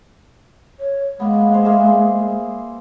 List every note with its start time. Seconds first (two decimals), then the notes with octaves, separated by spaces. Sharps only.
0.80 C#5
1.20 G#3 A#3 B3
1.52 C5 F5
1.64 A#3 G#4 E5